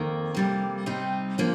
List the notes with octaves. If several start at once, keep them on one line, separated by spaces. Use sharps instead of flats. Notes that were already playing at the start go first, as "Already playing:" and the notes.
Already playing: F2 D#3 A#3
F2 C3 G3 A#3
C3 G3 C4 D#4
D3 F3 A#3